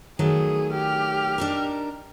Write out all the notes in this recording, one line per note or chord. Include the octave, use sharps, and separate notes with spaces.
D#3 F#3 A3 G#4
G4 F6
D4 D#4 A#4